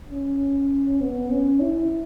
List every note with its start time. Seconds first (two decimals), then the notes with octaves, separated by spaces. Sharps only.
0.10 C#4
1.01 B3
1.31 C#4
1.61 E4